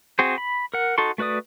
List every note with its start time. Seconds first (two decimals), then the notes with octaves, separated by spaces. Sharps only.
0.19 C4 F#4 G#4 C5
0.38 B5
0.74 A#4 F#5
0.98 D#4 F#4 A4 C6 C#6
1.18 A3 F#4 B4 D5 D#6